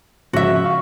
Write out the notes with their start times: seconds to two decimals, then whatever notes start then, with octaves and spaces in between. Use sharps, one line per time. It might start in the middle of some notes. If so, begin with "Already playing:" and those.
0.33 G#2 C#3 F3 F#4 E5
0.64 F5 C#6